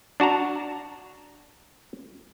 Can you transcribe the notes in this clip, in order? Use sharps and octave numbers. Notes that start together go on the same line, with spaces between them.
D4 F#4 A5 A#5